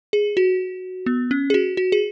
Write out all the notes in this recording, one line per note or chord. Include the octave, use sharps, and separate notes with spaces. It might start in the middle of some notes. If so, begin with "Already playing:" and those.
G#4
F#4
B3
C#4
G#4
F#4
F#4
G#4